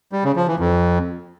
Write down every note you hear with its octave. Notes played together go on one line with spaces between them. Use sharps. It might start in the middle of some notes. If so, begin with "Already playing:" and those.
G3
C#3
F3
E3
F2